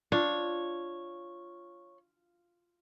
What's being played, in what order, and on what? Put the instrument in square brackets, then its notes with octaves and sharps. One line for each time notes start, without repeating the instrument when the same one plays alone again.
[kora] D4 [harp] F4 [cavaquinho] C#5